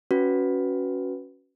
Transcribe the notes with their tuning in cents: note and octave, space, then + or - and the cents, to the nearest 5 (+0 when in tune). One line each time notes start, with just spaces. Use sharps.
C#4 +0 F#4 +0 B4 +0